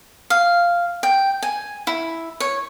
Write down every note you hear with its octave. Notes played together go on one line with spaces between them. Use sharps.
F5
G5
G#5
E4
C#5